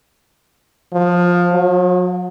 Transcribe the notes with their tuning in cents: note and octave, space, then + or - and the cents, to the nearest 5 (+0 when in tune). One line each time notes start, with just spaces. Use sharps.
F3 +15
F#3 -40